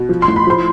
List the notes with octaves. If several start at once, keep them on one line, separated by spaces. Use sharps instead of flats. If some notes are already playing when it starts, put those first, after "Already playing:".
Already playing: B2
F3
C6
A2
B5
F3 C5 C6